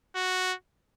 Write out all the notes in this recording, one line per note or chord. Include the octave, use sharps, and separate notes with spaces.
F#4